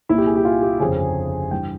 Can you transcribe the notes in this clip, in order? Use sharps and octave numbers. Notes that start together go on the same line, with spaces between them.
C2 A#2 E4
G4
G#4
G4
F4
G4
G1 F2 C#3 G#4
G2 E3 G5